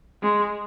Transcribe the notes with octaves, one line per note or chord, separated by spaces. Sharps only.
G#3